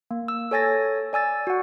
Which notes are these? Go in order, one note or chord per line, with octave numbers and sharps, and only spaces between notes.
A#3
E6
A4 C#5 G#5 A6 A#6
D5 G#5 E6 A6
F#4 F#5